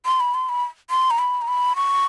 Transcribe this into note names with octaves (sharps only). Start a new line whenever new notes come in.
C6
B5
C6
B5
C6
A#5
B5
A#5
B5
C#6